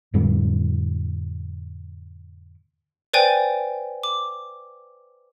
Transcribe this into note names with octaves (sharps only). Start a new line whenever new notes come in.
F2 A2 D3 G3
B4 C5 D5 G5 G#5
D6